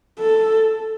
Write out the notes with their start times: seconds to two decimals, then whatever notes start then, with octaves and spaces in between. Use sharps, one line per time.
0.20 A4